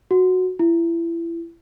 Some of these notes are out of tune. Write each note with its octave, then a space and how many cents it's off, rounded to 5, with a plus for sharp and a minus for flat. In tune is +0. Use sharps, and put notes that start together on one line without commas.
F#4 -5
E4 +30